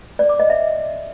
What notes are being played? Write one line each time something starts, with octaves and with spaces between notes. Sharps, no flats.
D5
D6
D#5
E5